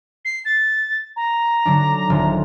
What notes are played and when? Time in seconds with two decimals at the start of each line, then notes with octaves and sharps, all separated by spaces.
0.25 C7
0.45 A6
1.16 A#5
1.66 D3 F#3 D4
2.10 D#1 D3 C4